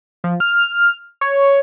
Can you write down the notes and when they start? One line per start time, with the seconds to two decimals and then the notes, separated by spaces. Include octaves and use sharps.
0.24 F3
0.40 F6
1.21 C#5